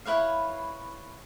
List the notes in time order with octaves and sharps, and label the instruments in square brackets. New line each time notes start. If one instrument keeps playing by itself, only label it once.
[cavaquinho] E4 B4 C#5 F5